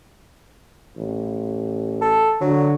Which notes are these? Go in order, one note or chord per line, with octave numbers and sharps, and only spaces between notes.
A1
A4
D3 F#3